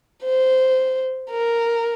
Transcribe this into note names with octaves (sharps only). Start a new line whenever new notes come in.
C5
A#4